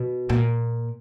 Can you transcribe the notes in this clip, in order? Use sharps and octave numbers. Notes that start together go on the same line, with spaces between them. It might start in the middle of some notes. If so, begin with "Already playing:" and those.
Already playing: B2
A#2